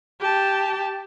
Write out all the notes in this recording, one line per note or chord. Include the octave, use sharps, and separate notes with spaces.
G4 A5